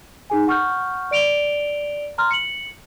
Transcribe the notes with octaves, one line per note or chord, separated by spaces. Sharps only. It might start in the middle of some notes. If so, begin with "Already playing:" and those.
D#4 G#4 G#5
F#5 C#6 F6 G6
D5 D7 F7 G7
A#5 C6 F6
C#7 F#7